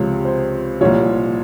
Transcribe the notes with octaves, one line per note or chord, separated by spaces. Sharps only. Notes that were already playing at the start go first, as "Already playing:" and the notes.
Already playing: C#2 C3 F3 C#5
C5
C2 A#2 F3 C#5